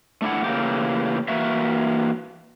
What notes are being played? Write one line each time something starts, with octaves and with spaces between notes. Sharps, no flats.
A3 D4 E4 F#5
C#3 E3 A3 A#3 G4
E3 A#3 F#4 E5